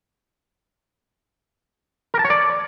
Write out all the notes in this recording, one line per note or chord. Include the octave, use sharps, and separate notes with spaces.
A#4
A5
C#5
D5